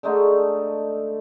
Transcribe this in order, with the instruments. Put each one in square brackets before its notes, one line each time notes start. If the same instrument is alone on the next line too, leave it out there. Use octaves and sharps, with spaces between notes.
[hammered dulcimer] D3 G#3 A3 D#4